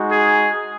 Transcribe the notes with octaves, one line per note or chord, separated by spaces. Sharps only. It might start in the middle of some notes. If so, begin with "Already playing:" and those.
Already playing: G#3 D#4 F#4
G#4